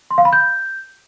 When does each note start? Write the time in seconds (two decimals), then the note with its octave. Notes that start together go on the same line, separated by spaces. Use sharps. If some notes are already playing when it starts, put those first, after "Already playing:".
0.11 C6
0.18 F5
0.25 B5
0.33 G6